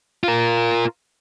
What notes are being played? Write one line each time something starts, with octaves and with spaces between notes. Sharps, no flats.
F4 A#4